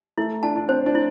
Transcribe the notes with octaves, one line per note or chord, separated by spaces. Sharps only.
A3 E4
D4 A5
D4
C4 C5
D4
E4